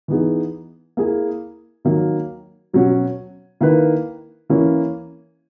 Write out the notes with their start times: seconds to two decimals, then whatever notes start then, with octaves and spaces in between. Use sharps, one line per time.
0.08 E3 B3 D#4 G#4
0.97 A#3 E4 G#4
1.85 D#3 F#3 A#3
2.73 B2 F#3 C#4 F#4
3.61 D#3 A#3 E4 B4
4.49 E3 A#3 C#4 E4